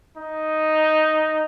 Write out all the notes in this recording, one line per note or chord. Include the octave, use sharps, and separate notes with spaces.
D#4